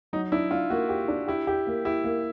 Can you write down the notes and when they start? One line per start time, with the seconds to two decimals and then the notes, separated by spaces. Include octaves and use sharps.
0.13 F#3 D#4
0.32 D4 E4
0.51 D4 F4
0.70 A#3 F#4
0.89 G4
1.08 D4
1.28 E4 G4
1.47 G4
1.67 A#3
1.85 E4 G4
2.04 A#3